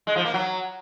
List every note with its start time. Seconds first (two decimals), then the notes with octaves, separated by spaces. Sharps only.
0.07 G#3
0.16 F3
0.25 A#3
0.34 F#3